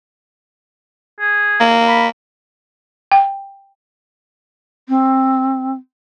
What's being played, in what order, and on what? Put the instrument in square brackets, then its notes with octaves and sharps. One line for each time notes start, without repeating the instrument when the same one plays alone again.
[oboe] G#4
[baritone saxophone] A#3
[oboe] B5
[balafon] G5
[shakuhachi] C4